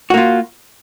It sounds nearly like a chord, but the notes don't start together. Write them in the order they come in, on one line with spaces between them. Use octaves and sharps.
F#4 A#3 F4